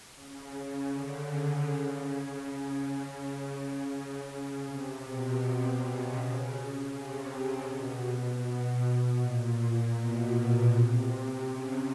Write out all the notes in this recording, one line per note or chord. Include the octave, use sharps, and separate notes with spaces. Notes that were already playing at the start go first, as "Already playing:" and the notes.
C#3
D3
C#3
C#3
C#3
C#3
C3
B2
C3
C#3
C#3
C3
B2
B2
B2
A#2
B2
C3
C#3